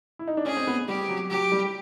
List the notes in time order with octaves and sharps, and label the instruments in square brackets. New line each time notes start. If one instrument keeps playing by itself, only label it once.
[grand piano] E4
D#4
D4
[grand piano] C#4 [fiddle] G#4
[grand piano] C4
B3
[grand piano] G3 [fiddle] G4
[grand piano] F#3
[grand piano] F#3 [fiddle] G4
[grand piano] G3